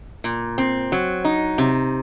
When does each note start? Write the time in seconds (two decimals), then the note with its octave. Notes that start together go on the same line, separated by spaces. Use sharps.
0.24 A#2
0.58 C4
0.92 F#3
1.25 D#4
1.58 C3